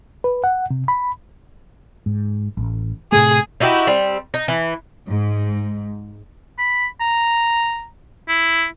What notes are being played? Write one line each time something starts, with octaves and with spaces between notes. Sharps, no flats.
B4
F#5
C3
B5
G#2
A1
A2 C3 A3 G#4
D#4 E4 F#4 G4
G3 C4
D#4
E3
G#2
B5
A#5
E4